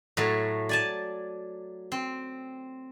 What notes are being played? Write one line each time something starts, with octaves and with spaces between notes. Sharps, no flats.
A2 F#3 A3
D5 G#5 A5
C4